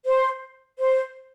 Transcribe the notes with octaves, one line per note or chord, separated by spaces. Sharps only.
C5
C5